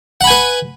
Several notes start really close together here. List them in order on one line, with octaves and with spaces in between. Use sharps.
F#5 B5 G#5 B4